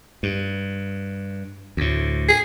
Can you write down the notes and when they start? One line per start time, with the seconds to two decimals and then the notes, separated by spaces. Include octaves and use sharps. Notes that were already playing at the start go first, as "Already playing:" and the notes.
0.23 G2
1.77 D2 A2
2.28 G#4